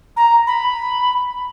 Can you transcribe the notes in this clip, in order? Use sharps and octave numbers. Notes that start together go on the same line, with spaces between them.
A#5
B5